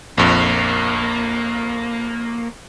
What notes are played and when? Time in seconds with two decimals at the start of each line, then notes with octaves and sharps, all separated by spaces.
0.18 A#1 F2 A#3